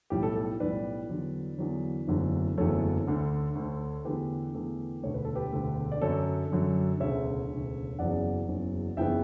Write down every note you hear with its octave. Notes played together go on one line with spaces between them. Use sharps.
B1 A2 G3 G4
A4
A4
B1 A2 G3 B4 D5
E2 D3 F#3
E2 D3 F#3
F#1 E2 D3 F#3 A3
F#1 E2 D3 F#3 A3 A4 C#5
D2 D3 A3
D2 D3 A3
E2 D3 A3 G4 B4
E2 D3 A3
E1 D2 D3 A3 C#5
B4
A4
G4 B4
E1 D2 D3 A3
D5
F#2 D3 F#3 A4 C#5
F#2 D3 F#3
E1 D2 C#3 C#5 E5
E1 D2 C#3
F#1 E2 C#3 F#3 D5 F#5
F#1 E2 C#3 F#3
F#1 C#3 E3 B3 E5 G5